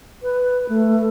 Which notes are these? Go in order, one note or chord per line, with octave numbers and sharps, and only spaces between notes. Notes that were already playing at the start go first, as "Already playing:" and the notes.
B4
A3